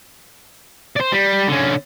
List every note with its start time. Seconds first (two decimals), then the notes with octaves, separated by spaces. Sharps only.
0.96 C5 D5
1.12 G3
1.48 D3 C#4